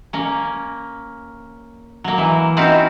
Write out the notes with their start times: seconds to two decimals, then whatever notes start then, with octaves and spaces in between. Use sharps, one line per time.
0.13 A#3 C#4
2.04 F#3 A#3
2.18 E3
2.57 C4 C#4 D#4 E4 F#4 F5